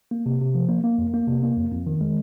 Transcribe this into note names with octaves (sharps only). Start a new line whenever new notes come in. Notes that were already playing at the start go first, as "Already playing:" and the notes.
A#3
C3
C3
F3
A#3
A#3
F2
A#3
C3
A#3
F2
F2
D#3
G#3